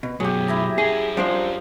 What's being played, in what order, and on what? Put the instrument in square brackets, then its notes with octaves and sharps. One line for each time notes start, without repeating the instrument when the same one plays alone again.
[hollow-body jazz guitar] B2
[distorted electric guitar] F#2 B2 [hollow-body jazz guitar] F#3 [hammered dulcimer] G4 G#4
[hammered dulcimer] E4 E5 A#5
[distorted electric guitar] C#4 A#4 [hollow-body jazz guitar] G#4
[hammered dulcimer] F3 [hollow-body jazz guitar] G3 D4 C5